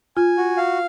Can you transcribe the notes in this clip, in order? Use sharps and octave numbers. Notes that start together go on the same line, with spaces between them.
F4 G#5
F#4
F5